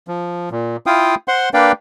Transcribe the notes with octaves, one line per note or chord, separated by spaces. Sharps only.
F3
A#2
E4 F4 F5 G5 D#6
C5 F#5 C6
A#3 D4 B4 D5 F5 G5